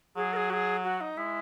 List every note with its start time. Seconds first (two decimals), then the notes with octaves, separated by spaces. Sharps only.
0.16 F#3 G#4
0.33 A#4
0.36 G#4
0.50 F#4
0.53 G#4
0.84 F#4
1.01 D#4
1.17 G#3 E4